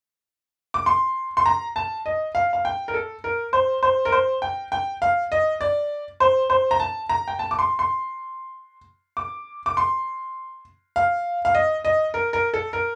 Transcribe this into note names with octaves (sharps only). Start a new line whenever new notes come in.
D6
C6
C6
A#5
A5
D#5
F5
F5
G5
A#4
A4
A#4
C5
C5
A#4
C5
G5
G5
F5
D#5
D5
C5
C5
A#5
A5
A#5
G5
A5
D6
C6
C6
D6
D6
C6
F5
F5
D#5
D#5
A#4
A#4
A4
A#4